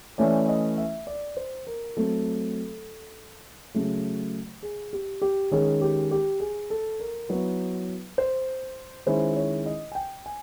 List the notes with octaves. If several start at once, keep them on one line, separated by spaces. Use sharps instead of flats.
E3 A3 C#4 E4 D5
D#5
E5
D5
C5
A#4
F#3 A3 C4 A4
C#3 F#3 A3
G#4
G4
G4
D#3 G#3 C#4 G#4
G4
G4
G#4
A4
A#4
F#3 B3 E4 B4
C5
D#3 G#3 C#4 E4 C5
C#5
D#5
G#5
G5
G#5